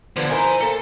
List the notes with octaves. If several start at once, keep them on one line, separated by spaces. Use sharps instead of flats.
D3 F3 B3
D#4 E4 A#4 C5 G#5
A#3 A4